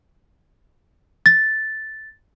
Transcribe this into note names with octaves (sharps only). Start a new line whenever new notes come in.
A6